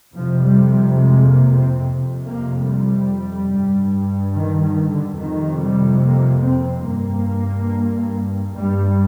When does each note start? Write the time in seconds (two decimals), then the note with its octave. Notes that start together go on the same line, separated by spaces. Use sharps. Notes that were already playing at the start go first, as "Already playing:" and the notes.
0.14 F2 C3 F3
0.42 G3
0.70 G3
0.98 G#3
1.26 A#3
1.54 C4
1.82 F2 C3
2.25 A#3
2.67 G3
3.51 G2
4.35 D#3
4.63 D#3
4.91 D3
5.19 F2 C3 D#3
5.61 G3
6.03 A#3
6.45 C4
6.87 G2 A#3
8.56 G2 G3